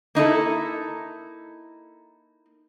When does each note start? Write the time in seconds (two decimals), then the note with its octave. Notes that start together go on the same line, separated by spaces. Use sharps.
0.15 A#3 D#4 E4 A4